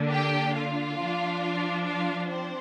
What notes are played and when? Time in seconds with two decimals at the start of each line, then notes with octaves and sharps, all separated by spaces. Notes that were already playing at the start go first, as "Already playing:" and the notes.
Already playing: D3 A#3 D4
0.10 G4 G5
0.54 F4 F5
0.98 F3 D4
1.85 F4 F5
2.28 C4 C5